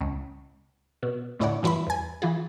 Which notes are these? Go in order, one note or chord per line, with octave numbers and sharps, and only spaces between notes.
C#2
B2
D2 A2 E4 C#5 D5 F#5
G2 E3 E4 F4 B5
E2 G#5
E3 F4 G#4